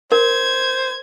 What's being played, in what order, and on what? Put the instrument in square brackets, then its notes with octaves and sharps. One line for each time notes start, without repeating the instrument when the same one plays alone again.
[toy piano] A#4 [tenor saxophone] C5 [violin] G#6